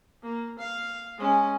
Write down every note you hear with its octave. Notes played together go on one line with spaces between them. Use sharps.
A#3
F5
G#3 C#4